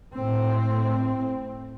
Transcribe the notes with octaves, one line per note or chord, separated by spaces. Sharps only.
A2 C4